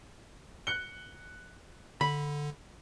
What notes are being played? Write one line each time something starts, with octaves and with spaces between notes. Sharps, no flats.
F#6 C#7 G7
D3 B5